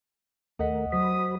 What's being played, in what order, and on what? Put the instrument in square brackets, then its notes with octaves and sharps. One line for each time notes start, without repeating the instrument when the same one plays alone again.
[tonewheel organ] D#2 A3 A#4 [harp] D#5 F#5 B6
[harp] F#3 [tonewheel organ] F#4 C5 B5 [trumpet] D#6